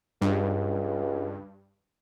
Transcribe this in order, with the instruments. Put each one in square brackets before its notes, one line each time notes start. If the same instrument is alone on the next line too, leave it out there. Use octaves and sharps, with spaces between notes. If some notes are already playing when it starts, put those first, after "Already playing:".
[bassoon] C#2 [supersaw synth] G2